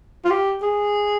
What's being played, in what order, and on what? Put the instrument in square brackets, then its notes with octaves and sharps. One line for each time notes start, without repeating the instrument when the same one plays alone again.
[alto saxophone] F4
G4
G#4